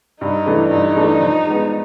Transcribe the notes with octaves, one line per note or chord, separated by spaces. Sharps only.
G2 D#4
E3 A3 D4
G2 D#4
E3 A3 D4
F3
G#3 B3